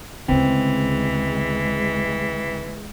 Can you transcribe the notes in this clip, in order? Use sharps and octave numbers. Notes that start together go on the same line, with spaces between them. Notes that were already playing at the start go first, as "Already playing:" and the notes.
D2 C#3 E3 G#3 C4